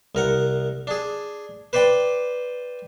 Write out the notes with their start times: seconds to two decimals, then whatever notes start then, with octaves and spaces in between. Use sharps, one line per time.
0.15 C2 A#4 F#5
0.87 D4 G#4
1.73 B4 C5 D5 G5 B5